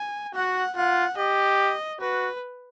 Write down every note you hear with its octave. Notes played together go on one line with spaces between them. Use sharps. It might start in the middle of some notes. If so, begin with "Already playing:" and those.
Already playing: G#5
F#4 F#5
F4 F#5
G4 D#5
F#4 B4